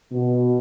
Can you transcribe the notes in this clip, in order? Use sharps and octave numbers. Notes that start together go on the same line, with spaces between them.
B2